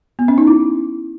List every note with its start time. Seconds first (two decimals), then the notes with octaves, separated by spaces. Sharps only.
0.19 B3
0.28 C#4
0.38 D#4
0.47 E4